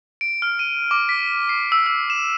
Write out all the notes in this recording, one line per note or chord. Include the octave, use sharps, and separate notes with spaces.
D7
F6
D#7
D6
B6
C7
E6
E6
E7